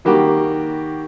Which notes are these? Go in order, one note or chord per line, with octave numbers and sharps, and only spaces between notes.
D#3 G3 A#3 F#4 G4